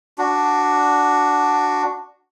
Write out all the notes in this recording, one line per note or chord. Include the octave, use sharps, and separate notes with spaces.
D4 F#4